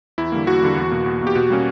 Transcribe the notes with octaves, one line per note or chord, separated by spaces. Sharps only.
E2 E4
D3 G3 A#3
E2 F#4
D3 G3 A#3
E2
B2 A#3
E2
B2 A#3
G4
B2 F#4
G3 A#3 C#4